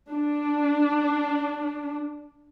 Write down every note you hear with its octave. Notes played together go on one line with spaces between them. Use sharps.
D4